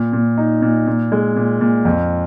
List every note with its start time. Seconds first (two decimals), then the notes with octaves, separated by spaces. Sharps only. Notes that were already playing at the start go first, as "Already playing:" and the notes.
Already playing: A#2
0.13 A#2
0.38 D#4
0.62 A#2
0.87 A#2
1.12 G#3
1.36 A#2
1.61 A#2
1.85 F2